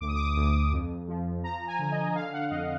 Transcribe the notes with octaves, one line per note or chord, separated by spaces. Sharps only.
D2 D6
D#6
D6
D#6
D6
D2 D#6
D6
F2
F3
F3 A#5
G#5
D3
D#5
D3 F5
F#5
F2 D#5